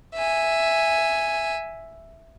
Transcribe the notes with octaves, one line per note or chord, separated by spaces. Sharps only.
E5 G#5